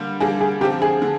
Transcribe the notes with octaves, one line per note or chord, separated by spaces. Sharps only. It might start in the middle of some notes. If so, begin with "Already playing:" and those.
Already playing: D3 G3 A#3 D4
D3 G3 A#3 D4 G#4
G#4
D3 F3 C4 G4
G#4
D3